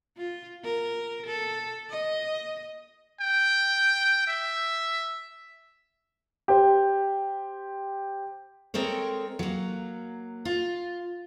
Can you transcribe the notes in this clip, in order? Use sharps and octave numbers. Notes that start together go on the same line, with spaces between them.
F4
A#4
A4
D#5
G5
E5
G4 C5
G#3 C4 A4 A#4 C#5
F#3 A#3
F4